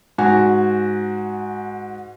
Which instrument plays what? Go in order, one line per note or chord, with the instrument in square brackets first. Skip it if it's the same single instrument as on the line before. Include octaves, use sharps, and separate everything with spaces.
[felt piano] G#2 F#4 G#5